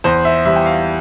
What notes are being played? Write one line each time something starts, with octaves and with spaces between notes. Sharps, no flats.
E2 C5
E5
E3 G3 E5
G5
F5